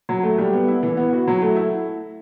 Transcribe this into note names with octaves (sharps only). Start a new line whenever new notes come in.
F#3
A3
G3
B3
E4
E3
B3
F#4
F#3
A3
E4